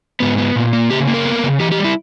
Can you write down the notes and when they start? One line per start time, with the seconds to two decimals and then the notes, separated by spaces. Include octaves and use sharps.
0.20 G#2 B3
0.38 B3
0.56 A#2
0.73 A#3
0.91 C#3 G4
1.08 A#3
1.14 A#4
1.25 B3
1.44 C#3
1.60 E3 G4
1.72 G4
1.78 G3
1.84 E4